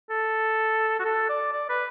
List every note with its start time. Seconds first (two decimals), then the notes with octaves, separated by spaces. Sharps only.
0.10 A4
0.99 F#4
1.05 A4
1.29 D5
1.52 D5
1.69 B4